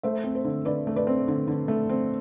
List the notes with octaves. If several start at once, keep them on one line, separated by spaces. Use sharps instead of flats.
A3 C5 E5
C4
C5
D3
D3 B4 D5
A3
B4 D5
C4
D3
D3
A3
C4